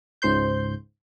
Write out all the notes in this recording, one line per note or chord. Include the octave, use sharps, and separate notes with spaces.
C#2 G#2 C5 C6 G6